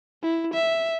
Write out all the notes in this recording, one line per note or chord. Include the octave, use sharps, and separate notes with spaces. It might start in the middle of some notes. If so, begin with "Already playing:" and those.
E4
E5